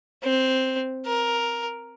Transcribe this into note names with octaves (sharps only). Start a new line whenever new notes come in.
C4
A#4